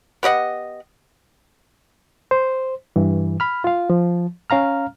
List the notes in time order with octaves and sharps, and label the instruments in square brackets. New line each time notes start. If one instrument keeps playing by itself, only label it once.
[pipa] B3 G4 D#5 F#5
[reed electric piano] C5
G2 E3
B5 F6
F4 F5
F3
C#4 F5 A#5 F6